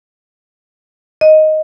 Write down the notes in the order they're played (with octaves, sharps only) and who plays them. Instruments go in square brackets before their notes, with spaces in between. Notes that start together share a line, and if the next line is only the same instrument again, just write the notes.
[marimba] D#5